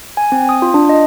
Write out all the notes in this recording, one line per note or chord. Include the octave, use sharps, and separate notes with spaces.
G#5
C4
D#6
F4
D4
D#5